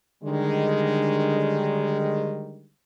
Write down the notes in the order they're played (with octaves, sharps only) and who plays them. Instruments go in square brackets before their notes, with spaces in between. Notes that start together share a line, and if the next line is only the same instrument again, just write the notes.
[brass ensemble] D3 D#3 G3 G#3